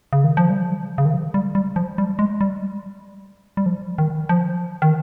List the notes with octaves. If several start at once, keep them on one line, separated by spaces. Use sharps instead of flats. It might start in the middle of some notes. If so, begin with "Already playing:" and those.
C#3
D#3
F3
G3
C#3
D#3
F3
G3
G3
F3
G3
G#3
G3
G3
F3
D#3
F3
D#3